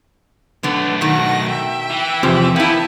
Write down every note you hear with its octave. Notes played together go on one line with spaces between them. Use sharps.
B1 D3 A3 B3
B2 D#3 F#5 A#6
E5 G5
E3
E2 C3 F3
A#3 B3 E4 E5 G5 A5